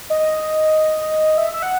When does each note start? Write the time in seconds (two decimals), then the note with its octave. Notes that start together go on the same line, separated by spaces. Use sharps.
0.10 D#5
1.38 E5
1.53 E5
1.63 F#5